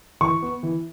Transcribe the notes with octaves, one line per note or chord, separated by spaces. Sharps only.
E3 C#6
B3
E3